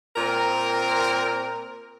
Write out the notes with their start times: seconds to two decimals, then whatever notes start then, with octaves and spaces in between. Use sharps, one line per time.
0.16 A#2 C4 A#4